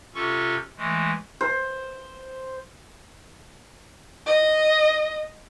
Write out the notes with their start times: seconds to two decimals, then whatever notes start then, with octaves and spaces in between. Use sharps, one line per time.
0.15 C3 C#4 F4 A4 C#6
0.77 E3 G#3 A3
1.41 C5
4.27 D#5